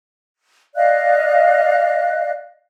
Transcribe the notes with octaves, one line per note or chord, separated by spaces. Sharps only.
D5 D#5 F5 F#6